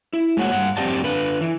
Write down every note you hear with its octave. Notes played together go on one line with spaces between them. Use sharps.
E4
G#3 A#3 F#4 C#5 F#5
G2 F#5
F2 G#3 C4 G4 D5 A5
D3 B4
E3